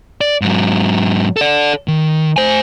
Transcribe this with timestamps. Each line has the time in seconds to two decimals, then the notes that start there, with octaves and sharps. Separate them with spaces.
0.21 D5
0.42 G#2 F#3
1.37 A4 D5
1.88 D#3
2.37 C5 G#5